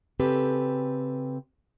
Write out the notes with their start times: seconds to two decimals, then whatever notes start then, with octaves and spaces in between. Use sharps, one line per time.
0.19 C#3 C4 G4 A4 B4